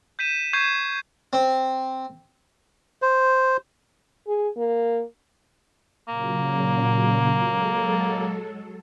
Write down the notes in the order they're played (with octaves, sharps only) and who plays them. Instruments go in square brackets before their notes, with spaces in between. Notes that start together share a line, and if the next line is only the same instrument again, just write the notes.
[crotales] G6 B6 D#7 E7
C#6 G6 G#6 C7 D#7 E7
[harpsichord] C4
[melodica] C5
[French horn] G#4
A#3
[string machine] A#2 C#3 F#3 [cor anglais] A#3
[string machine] F#3 G#3 A4